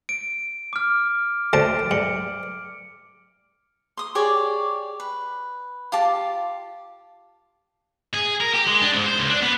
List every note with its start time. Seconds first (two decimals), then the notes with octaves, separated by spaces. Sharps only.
0.09 D7
0.73 D6 F6
1.53 D2 C5 A5 D7
1.91 G2 C#7
3.97 C6 D#6
4.15 G4 G#4 C#5 D5
5.00 B4
5.92 F4 G4 A5
8.14 G#4
8.40 A#4
8.54 G4
8.66 G#3
8.81 D4
8.93 G#2
9.06 C5
9.18 C#2
9.30 D4
9.42 B3